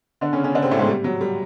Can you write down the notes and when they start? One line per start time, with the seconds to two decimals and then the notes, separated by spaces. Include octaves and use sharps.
0.21 D3 D4
0.33 C#3 C#4
0.44 C#3 C#4
0.54 D3 D4
0.62 C3 C4
0.71 A2 A3
0.79 G#2 G#3
0.88 G3
1.04 F#3
1.21 G3